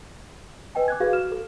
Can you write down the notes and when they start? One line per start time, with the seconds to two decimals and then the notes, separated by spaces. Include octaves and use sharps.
0.75 B4 D#5 G5 G#5
0.88 D6 F#6 G#6
1.00 F#4 G#4 B4 F5
1.13 F#4 F6 E7
1.32 A4